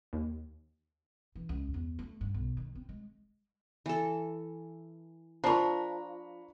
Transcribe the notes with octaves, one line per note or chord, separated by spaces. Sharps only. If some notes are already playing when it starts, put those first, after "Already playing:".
D#2
E3
C#2
E2
A3
G2
B1
D#3
C4
G#3
E3 A4
F3 D4 A#4 A#5 B5 C#6